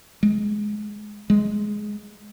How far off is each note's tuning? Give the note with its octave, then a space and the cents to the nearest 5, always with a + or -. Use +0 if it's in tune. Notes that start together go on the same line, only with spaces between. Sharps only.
G#3 +15
G#3 +10